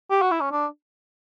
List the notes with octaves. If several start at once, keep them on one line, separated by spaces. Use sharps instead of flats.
G4
F#4
E4
C#4
D4